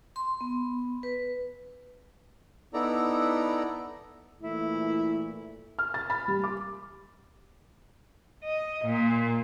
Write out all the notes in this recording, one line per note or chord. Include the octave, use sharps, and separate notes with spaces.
C6
B3
B4
B3 D#4 E4 A4 D5 A#5
A#2 E3 A3 E4
F6
A6
B5
G3
D6
D#5
A#2